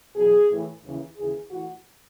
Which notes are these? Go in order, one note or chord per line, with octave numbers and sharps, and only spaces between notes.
E2 B2 F#3 G#4
A2 E3
D#2 C#3 E3
D#2 C#3 E3 G#4
A2 E3 F#4